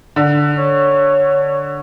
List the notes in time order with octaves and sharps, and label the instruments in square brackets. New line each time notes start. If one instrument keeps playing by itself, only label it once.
[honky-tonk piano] D3
[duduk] C#5